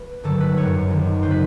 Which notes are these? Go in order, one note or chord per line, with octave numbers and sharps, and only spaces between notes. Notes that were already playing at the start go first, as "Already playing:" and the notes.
Already playing: B4
G1 G2 D#3 F#3 A4
B4
G#1 F#2 D#3 C#5
G#1 F#2 D#3
C#3 F#3 C5
B4